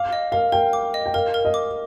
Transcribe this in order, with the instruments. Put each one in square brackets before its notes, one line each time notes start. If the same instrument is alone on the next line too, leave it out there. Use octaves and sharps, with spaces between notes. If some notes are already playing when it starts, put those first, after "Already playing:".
Already playing: [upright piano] F5 [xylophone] D6
[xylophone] D#5
[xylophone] A#4 [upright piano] F5
[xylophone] A#4 [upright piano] G5
[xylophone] D6
D#5
[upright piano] G5
[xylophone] A#4 [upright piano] F5
[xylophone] A#4
[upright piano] D#5
[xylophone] D6